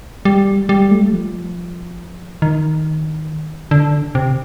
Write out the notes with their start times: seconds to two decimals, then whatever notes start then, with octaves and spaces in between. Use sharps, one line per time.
0.25 G3
0.69 G3
0.91 A3
1.01 G3
1.12 F3
2.42 D#3
3.71 D3
4.15 C3